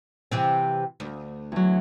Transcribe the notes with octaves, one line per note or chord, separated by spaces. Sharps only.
C3 E3 C4
D2
E2 F#3